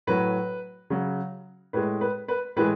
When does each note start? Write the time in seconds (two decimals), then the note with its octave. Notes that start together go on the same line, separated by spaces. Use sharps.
0.07 A2 F#3 B4
0.90 C#3 F#3
1.73 A2 G#3 B4
2.01 B4
2.28 B4
2.56 A2 E3 G#3 B4